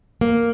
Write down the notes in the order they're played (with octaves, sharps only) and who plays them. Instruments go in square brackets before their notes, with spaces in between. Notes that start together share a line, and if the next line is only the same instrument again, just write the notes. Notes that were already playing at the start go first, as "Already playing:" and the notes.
[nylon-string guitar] A#3